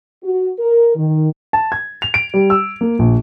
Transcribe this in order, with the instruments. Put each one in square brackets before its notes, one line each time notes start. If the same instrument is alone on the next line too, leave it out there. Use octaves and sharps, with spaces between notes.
[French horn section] F#4
A#4
D#3
[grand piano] A5
G#6
F7
D7
G3
E6
A#3
A#1